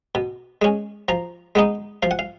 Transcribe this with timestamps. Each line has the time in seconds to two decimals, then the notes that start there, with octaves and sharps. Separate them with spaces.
0.15 B2
0.62 G#3 C#4
1.08 F3 A#5
1.55 G#3 B3 D#4
2.03 F3 F5
2.11 F#5
2.19 F5